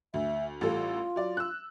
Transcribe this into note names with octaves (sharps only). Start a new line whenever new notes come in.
D2 E5
A1 G3 F4 A4
F#3 D5
E6 F#6